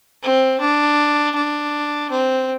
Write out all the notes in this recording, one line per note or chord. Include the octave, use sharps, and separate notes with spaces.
C4
D4
D4
C4